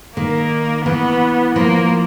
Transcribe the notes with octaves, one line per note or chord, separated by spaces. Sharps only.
D#3 A#3
E3 B3
F3 A#3